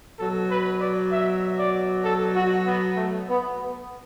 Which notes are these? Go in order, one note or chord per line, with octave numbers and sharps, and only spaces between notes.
B2 F#3 A4
B4
D5
E5
D5
A4
F#4
B3
A3
B3